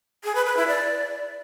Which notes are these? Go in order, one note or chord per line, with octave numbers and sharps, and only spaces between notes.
G#4
B4
B4
E4
D5